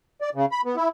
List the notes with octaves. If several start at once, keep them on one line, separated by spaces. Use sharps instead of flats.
D5
C#3
B5
B3
E4